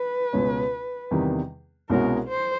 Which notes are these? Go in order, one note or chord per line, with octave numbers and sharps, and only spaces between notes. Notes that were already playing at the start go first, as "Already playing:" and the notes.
Already playing: B4
C#2 B2 G#3 C#4
E2 C3 D#3 G3 B3
C2 B2 G#3 C#4 F#4 A#4
C5